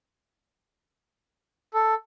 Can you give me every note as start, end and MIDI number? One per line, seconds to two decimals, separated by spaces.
1.74 1.94 69